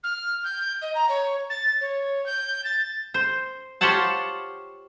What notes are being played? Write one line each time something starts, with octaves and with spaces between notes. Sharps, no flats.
F6
G6
D#5
A#5
C#5
A6
C#5
G6
A6
C5
F4 G4 C5 C#5 F#5 A5